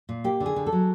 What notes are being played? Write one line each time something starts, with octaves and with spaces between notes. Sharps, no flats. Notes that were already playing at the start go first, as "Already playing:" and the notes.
A#2
A#3 G4
D3
G#4
D3
A4
F#3